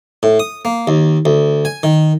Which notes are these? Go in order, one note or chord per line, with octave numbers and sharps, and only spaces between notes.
A2
D#6
A#3
D#2
D2
G#5
D#3